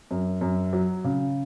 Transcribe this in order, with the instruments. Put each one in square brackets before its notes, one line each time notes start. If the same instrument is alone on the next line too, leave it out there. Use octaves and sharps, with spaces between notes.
[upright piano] F#2
F#2
F#3
C#3